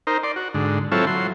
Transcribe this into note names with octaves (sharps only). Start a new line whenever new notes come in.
D#4 A#4 C5
D5 C6
F#4
G#2 D3
F#3 C4 E4 F4 A4 C#5
F#3 C6